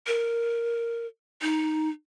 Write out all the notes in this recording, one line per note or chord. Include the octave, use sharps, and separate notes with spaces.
A#4
D#4